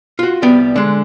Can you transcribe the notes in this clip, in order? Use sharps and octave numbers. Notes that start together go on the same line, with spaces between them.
F4 F#4
C2 G3 B3 G5
D3 G#3